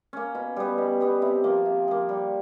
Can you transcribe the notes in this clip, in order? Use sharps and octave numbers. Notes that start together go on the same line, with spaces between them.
A#3 C#4
B2
G3 B3
B2
G3 B3
C3
F3 A#3
C3
F3 A#3
G3